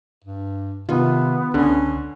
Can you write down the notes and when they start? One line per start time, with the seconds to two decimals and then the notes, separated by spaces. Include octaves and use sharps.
0.24 G2
0.89 C3 D#3 B3 F4
1.54 C#2 D3 C#4